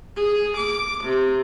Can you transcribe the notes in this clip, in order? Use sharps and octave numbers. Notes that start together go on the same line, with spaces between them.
G#4
D6
C3